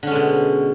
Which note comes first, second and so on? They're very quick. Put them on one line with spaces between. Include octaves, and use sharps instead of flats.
D3 C#4 G#3 B2